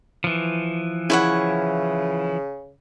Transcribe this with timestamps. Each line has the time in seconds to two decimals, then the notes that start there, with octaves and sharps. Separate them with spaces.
0.24 E3 F3
1.10 C#3 E4 C#5 F#5